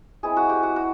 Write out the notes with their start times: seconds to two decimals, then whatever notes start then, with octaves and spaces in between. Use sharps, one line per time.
0.23 G#3 C4 E4 G#4
0.37 F#4
0.49 G4
0.63 F#4
0.76 F#4